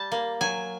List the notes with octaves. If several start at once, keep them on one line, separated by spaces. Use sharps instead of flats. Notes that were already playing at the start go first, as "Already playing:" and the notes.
Already playing: G3 A5
A#3
F#3 G#5